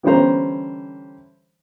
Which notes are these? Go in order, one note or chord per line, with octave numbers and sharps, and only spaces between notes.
D3 E3 G3 C#4 C5 A#5